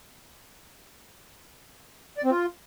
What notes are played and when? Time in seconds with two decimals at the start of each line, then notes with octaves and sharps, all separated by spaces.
2.18 D5
2.24 C4
2.30 F4